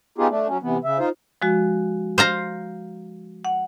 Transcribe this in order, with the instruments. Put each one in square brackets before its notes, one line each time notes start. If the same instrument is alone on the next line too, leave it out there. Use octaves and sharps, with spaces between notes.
[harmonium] B3 D#4 F4 G4 G#4
A3 D4
F#3 C#4
C3 E3 B3
C#3 E5
D#4 F4 C5
[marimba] F3 G#3 F#4
[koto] C5 F5 A#5
[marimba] F#5